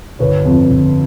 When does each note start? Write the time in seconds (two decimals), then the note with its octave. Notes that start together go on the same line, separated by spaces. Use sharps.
0.19 G1 B4 C#5
0.45 F2
0.70 G1